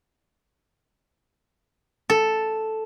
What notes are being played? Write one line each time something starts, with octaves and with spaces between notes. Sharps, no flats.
A4